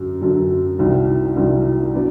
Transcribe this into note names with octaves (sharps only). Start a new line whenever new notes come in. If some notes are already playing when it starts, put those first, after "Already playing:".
Already playing: F#2 D3 F#3
F#2 D3 F#3
C2 C3 D#3 F#3
C2 C3 D#3 F#3
F#3 B3 D4